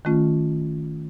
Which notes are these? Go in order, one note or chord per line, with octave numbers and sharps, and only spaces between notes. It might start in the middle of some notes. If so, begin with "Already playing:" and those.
D#3 A3 C#4 F4